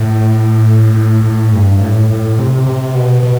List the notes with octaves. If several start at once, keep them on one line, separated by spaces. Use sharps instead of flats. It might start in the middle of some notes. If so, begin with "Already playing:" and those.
Already playing: A2
A2
A2
G2
A2
A2
C3
C3
B2
B2